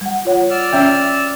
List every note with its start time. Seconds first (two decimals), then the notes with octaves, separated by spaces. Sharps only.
0.01 G3 F#5
0.25 F4 C#5 F#5
0.50 D5 E6 F6
0.73 C#4 E5 G5